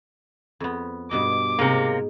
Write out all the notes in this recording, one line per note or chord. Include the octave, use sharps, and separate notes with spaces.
F2 B3
G2 B2 D#5 D6
G#2 C3 A#3